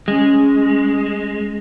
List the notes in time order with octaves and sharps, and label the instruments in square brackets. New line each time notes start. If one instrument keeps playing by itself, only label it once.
[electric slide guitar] G#3 [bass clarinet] C#4